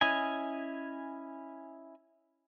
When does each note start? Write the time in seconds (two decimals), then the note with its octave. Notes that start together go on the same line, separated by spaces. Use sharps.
0.01 C#4 E4 D#5 G#5